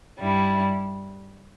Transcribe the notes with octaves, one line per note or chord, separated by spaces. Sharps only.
G2 G3 E4